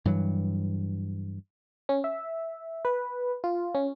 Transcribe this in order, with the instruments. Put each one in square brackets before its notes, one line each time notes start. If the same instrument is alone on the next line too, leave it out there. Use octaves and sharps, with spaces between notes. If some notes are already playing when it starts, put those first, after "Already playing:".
[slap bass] G2 E3 F#3
[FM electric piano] C#4
E5
B4
F4
C#4